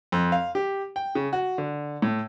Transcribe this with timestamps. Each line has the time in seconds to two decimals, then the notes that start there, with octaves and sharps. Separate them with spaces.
0.12 F2
0.32 F5
0.55 G4
0.96 G5
1.15 C#3
1.33 F#4
1.58 D3
2.02 A2